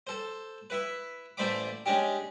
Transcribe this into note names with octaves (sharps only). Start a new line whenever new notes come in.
A4 C5
E4 B4
A1 A3 C5 D5 B5 D6
G#3 C#4 D4 G4